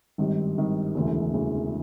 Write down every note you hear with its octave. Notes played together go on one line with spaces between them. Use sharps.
G#1 G2 D#3 G3
G#1 G2 D#3 G3
E1 D2 C#3 E3
E1 D2 C#3 E3